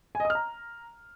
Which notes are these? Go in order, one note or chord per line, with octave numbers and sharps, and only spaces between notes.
G#5
D#5
D#6
F6
A#5